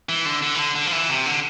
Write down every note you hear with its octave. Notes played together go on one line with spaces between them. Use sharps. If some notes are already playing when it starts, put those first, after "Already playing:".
E3
D3
D3
E3
D3
D3
F3
E3
C3
D3